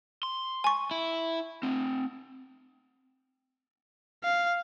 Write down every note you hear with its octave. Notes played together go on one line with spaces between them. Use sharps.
C6
G#5 C#6
E4
A3 C4
F5